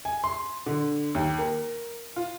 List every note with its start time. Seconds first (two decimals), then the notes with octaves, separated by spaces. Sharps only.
0.05 G#5
0.24 C6
0.66 D3
1.15 D#2
1.39 A#4
2.16 F4